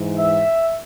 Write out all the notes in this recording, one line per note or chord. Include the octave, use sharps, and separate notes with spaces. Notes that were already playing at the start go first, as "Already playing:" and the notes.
Already playing: G#2 E3
E5